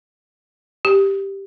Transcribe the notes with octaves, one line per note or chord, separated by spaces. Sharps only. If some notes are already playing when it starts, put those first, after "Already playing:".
G4